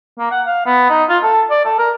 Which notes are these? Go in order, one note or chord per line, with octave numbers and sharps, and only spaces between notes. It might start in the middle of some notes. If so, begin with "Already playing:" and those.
A#3
F#5
F5
B3
D#4
F4
A4
D5
A4
A#4